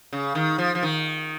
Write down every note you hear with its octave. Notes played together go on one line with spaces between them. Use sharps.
C#3
D#3
F3
F3
D#3